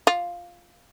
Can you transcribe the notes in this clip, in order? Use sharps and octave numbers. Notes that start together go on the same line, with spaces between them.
F4